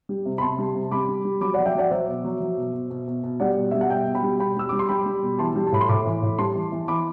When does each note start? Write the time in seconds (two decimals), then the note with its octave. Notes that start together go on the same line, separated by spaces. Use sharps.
0.09 G3
0.25 C3
0.38 B5
0.42 C3 A5 C6
0.59 G3
0.75 C3
0.91 G3 B5 D6
1.08 G3
1.25 G3
1.41 F#3 B5 D6
1.54 F#3 D5 F#5
1.66 E5 G5
1.75 F#3 D5 F#5
1.91 F#3 C5 E5
2.08 B2
2.24 F#3
2.41 F#3
2.57 B2
2.74 B2
2.90 B2
3.07 B2
3.23 B2
3.40 G3 D5 F#5
3.56 B2
3.71 G3 E5
3.81 F#5
3.89 B2 E5 G5
4.06 B2
4.14 G5 B5
4.23 G3
4.40 B2 G5 B5
4.57 G3 E6
4.69 G3 D6
4.79 C6
4.89 G3 G5 B5
5.06 G3
5.22 B2
5.39 E3 A5 C6
5.56 G3
5.67 A5
5.72 A2 B5
5.81 C6
5.89 A2 B5 D6
6.06 E3
6.22 A2
6.39 G3 A5 C6
6.55 E3
6.72 E3
6.88 E3 B5 D6